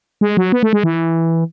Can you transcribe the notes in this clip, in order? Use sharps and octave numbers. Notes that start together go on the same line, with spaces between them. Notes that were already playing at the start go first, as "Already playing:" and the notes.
G#3
F#3
B3
A3
G#3
E3